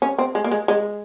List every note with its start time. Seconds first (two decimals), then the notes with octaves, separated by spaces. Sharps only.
0.02 C#4
0.18 C4
0.35 G#3
0.44 A#3
0.51 G#3
0.68 G#3